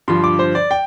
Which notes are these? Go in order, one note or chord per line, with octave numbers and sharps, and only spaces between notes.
G2 D3 F3 C6
D6
C5
D5
G5